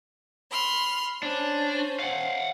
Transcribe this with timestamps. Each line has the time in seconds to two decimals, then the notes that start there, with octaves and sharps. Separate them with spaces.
0.51 B5 C6 F6
1.23 C#4 D4 C5
2.00 F5 F#5